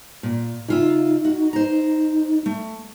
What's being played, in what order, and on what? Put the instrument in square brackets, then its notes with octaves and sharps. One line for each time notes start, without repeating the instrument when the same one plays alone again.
[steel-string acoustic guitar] A#2
[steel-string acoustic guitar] C#3 F4 E5 [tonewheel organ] D#4
[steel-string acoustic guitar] F#4
C5 A#5
A3